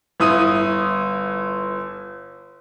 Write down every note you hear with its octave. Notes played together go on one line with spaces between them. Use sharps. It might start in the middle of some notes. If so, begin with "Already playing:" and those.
G1 E4 D#6 D#7